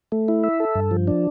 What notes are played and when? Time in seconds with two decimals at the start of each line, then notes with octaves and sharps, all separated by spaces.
0.12 A3
0.28 E4
0.44 E5
0.60 A4
0.75 G2
0.91 F3
1.08 D4